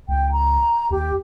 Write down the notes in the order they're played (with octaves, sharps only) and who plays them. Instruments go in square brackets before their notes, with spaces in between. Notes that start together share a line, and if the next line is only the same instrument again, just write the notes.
[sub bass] C#2 [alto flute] G5
[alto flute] A#5
[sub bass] D#2 [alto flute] G4